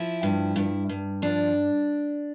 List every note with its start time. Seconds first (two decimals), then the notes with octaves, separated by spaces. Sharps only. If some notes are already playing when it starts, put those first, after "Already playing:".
Already playing: F3 E4
0.23 G2
0.56 G2
0.89 G2
1.22 F3 D4